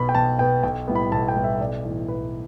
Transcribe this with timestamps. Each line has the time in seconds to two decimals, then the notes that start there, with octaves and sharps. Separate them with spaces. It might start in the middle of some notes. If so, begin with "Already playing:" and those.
Already playing: B1 B2 B3 B5
0.09 G5
0.15 B1 A5
0.39 B2 B3 G5
0.63 B1 G5
0.87 A2 G3 B3
0.95 B5
1.12 B1 A5
1.28 G5
1.36 A2 G3 B3
1.44 E5
1.60 B1 D5
1.84 A2 E3
2.08 B1 B4